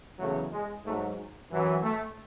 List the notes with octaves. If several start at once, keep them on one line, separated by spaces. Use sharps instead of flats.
E2 C#3 F#3 A3
G#3
G#2 F#3 A3
F#2 E3
A3